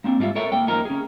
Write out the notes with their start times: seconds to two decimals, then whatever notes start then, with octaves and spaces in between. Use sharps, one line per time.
0.04 A#3 C4 D4
0.19 G#2 G3 C4 F4 E5
0.35 A4 A#4 C#5 E5
0.52 A#3 G5
0.67 F#2 F3 A#3 D#4 A#4 A#5
0.85 C#4 G#4